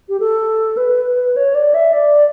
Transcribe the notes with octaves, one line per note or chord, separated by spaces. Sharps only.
G4
A4
B4
C#5
D5
E5
D5